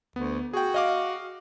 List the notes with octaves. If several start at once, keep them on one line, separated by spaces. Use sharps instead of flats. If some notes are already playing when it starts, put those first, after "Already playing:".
D2 B3
F#4 G#4 G5
D#5 F5 D6